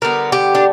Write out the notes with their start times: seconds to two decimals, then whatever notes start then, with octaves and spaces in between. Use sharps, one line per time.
0.02 D3 G3 B3 A#4
0.32 G4
0.55 D4